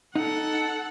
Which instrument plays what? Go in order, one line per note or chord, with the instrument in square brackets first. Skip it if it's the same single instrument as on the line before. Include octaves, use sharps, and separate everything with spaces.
[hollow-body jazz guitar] D#4 [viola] A4 F#5